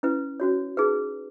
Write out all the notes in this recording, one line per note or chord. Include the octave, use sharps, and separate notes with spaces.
C#4 E4 B4
C#4 F#4 C#5
D#4 G#4 B4